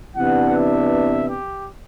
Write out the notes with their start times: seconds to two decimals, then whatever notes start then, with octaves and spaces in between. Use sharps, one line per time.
0.16 C3 E3 B3 D4 F#5
0.54 E5
1.29 G4